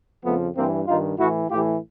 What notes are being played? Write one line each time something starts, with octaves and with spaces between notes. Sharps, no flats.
F2 C#3 F3 A3 B3
G2 E3 A#3 C4
G2 D#3 D#4 F4
A2 E3 E4 F#4
A2 E3 F4 G4